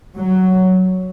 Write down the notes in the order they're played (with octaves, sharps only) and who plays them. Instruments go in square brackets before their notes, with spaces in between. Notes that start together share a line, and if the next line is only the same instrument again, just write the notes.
[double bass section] F#3